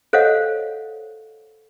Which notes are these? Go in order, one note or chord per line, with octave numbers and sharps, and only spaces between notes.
A4 C5 C#5 D#5 F5 F#5